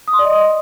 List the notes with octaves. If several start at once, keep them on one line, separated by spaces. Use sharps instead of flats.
D#6
C6
D5
D#5